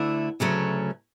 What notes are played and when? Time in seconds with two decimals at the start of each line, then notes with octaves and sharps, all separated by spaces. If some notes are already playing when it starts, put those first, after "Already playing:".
Already playing: D2 D3 A3 E4
0.40 D2 C#3 F#3 A3 C#4